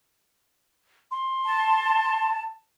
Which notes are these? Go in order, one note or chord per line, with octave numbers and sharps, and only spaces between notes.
C6
A5